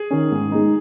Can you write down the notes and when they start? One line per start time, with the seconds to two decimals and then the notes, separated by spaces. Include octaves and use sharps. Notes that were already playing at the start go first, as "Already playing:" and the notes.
Already playing: G#4
0.11 D#3 C#4
0.32 G#2
0.52 G#3 D#4